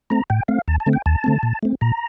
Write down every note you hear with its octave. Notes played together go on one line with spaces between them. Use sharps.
A3 C4 A#5
A2 G5
A3 C4 F5
D#2 A5
A5
D3 A3 C4
G5
D#2 A5
D3 A3 C4
A#2
A3 C4
A#2 A#5